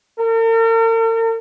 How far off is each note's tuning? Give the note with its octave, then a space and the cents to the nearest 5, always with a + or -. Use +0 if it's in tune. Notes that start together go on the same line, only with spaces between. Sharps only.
A#4 -45